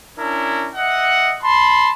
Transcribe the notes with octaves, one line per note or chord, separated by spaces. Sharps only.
C#4 D4 E4 A#4
D#5 E5 F#5
A5 B5 C6